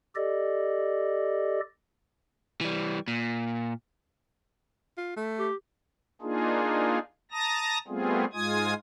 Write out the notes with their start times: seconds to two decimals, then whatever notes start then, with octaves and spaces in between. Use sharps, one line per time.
0.16 G4 A4 D5 D#5
2.61 E3 G3
3.08 A#2
4.97 F4
5.17 A3
5.39 G4
6.22 A#3 D4 D#4 F4 G#4
7.32 A5 A#5 D#6 A#6
7.88 G3 A3 B3 C4 F4 G#4
8.33 G#2 G#3 F4 G#5 D#6 G#6